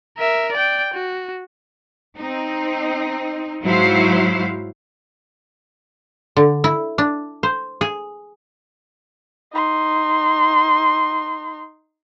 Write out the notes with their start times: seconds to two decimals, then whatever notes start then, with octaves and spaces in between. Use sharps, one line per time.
0.18 A#4 E5
0.52 D5 G5
0.94 F#4
2.17 C4 D#4
3.63 G#2 F#3 E4 F#4 C5 F5
6.37 D3
6.64 E4
6.98 D4
7.43 C5
7.81 G#4
9.53 D#4 C6